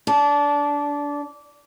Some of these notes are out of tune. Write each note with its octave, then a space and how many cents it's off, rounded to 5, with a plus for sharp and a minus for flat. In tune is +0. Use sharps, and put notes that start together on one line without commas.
D4 -20